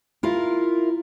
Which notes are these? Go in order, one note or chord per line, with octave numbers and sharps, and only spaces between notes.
E4 F4 A#4